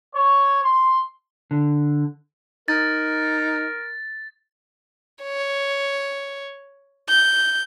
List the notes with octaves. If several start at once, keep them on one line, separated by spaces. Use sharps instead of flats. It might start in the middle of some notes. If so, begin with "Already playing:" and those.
C#5
C6
D3
D#4 A#4 A6
C#5
G6